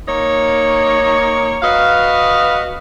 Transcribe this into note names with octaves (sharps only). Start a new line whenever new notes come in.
A#3 D#4 C#5
F#4 B4 D#5 F5